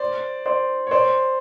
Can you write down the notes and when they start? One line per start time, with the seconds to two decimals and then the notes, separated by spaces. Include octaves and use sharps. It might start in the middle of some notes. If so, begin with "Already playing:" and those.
Already playing: C5 D5
0.46 C5 D5
0.87 C#5
0.91 C5 D5